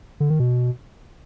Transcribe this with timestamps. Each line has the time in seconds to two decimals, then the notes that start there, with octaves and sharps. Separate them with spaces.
0.20 D3
0.30 D#3
0.39 B2